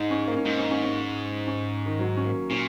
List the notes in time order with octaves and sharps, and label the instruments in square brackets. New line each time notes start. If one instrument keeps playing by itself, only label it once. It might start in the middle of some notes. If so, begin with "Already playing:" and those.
Already playing: [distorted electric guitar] G#2 [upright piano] D#4
[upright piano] C#4
A#3
C#4
[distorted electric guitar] G#2 [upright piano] D#4
[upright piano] C#4
C#4
C#4
C#4
D#3
F#3
C#4
A#3
[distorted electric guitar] A#2 [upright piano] C#4